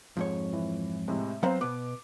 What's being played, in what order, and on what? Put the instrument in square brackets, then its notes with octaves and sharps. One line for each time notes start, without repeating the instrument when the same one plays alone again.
[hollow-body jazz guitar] F2 G#2 C#5
[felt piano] E3
A2 C3 G#3
[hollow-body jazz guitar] F#3 B3 C4 [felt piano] C5 F5 A#5
[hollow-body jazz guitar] B2 B3 [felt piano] D6